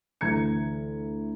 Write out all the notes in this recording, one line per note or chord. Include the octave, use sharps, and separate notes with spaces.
D2 E3 A#5 G#6 C#7